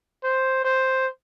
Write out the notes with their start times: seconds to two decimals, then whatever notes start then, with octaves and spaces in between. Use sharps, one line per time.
0.24 C5
0.64 C5